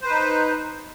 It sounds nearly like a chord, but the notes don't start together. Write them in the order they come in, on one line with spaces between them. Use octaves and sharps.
C5 B4 D#4